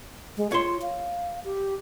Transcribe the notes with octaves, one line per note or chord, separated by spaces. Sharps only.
G#3
F4 C#5 C6
F5
G4